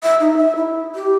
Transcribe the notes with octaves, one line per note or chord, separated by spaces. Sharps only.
E5
D#4
E5
E4
G4